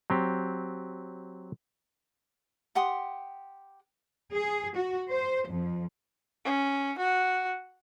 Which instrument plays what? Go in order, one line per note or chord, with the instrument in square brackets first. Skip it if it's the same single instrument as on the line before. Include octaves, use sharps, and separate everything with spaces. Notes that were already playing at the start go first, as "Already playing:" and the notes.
[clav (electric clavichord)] F#3 C4 G4
[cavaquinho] G4 F#5 C6 D#6
[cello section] G#4
F#4
C5
F2
[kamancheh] C#4
F#4